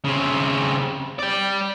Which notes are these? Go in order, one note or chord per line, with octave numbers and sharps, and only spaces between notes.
C#3 C4
D5 G5